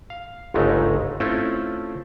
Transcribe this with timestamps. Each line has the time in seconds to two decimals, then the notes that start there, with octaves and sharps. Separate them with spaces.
0.10 F5
0.54 G1 C#2 G#2 G#3 A3 D#4
1.20 A3 C4 C#4 E4 F4 A4